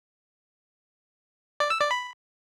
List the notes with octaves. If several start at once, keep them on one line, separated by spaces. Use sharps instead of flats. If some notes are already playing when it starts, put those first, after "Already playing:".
D5
E6
D5
B5